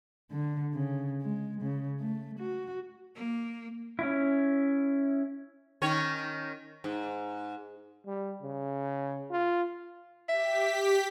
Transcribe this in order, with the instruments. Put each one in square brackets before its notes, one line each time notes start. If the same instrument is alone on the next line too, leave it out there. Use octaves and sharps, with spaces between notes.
[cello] D3
C#3
G#3
C#3
A3
F#4
[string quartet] A#3
[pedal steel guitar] C#4 E4
[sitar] D#3 C#4 C#5
G#2
[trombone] G3
C#3
F4
[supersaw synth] G4 B6 [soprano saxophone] E5